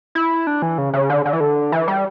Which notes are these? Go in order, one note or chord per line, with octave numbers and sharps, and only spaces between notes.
E4
D4
E3
C#3
C#3
D3
D3
E3
D3
E3
G3